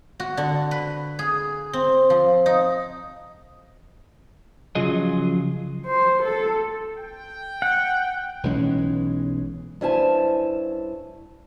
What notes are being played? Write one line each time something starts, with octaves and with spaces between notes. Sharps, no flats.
F#4
D3
B4
G#4
C4
F3
D#4
C#3 F3 F#3 F4 G#4 D#5
C5
A4
G5
F#5
B1 E3 G#3 C#4
G2 C#4 E4 C5 G#5 A5